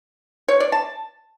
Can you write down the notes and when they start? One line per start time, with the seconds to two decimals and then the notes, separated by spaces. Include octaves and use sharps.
0.48 C#5
0.60 D5
0.72 A5